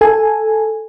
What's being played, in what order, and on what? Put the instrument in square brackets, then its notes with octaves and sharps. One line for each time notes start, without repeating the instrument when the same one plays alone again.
[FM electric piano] A4 G#5